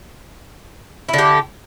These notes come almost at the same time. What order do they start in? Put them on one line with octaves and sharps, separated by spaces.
E4 D3 G4